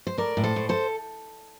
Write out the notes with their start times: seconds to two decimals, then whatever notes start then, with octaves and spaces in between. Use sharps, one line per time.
0.07 C5
0.18 A2 A#4 D5
0.37 A2
0.44 A4 C5
0.56 A2
0.69 A4 C5